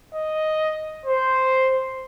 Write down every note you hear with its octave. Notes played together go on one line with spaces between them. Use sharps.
D#5
C5